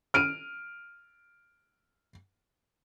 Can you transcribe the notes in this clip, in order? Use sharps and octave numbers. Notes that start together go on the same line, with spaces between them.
F6 D7 D#7